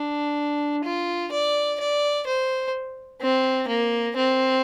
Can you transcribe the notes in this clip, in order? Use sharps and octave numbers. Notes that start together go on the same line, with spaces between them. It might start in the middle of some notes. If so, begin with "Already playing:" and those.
Already playing: D4
F4
D5
D5
C5
C4
A#3
C4